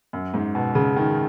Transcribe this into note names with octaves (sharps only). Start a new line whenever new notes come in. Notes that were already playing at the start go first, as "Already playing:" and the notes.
F#2
G#2
B2
C#3
D#3